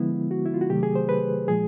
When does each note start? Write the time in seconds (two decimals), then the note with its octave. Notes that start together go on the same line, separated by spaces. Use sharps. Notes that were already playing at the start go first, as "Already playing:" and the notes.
Already playing: D3 F3 G#3 B3 E4
0.31 F#4
0.46 E4
0.54 F4
0.61 F#4
0.70 C3 D#3 F#3 A3 G4
0.83 G#4
0.95 C5
1.09 B4
1.48 A#2 F3 G#3 G#4